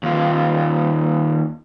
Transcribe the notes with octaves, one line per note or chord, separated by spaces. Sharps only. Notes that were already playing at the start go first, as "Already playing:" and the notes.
D#2 F4